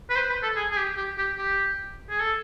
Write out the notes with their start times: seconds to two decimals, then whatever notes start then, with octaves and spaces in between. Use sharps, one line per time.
0.10 B4
0.16 C5
0.29 B4
0.43 A4
0.56 G#4
0.71 G#4
0.77 G4
0.97 G4
1.18 G4
1.38 G4
2.10 G#4
2.20 A4